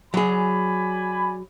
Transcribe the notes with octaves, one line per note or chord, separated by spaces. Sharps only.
F#3 G#4 D5 G#5 B5